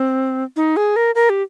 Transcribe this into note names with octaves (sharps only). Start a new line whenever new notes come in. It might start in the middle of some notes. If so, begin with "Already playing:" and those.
Already playing: C4
D#4
G#4
A#4
A#4
G4